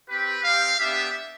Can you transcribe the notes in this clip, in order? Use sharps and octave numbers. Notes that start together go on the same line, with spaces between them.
C4 G4 B4
C4 G4 F5
B3 D4 G4 E5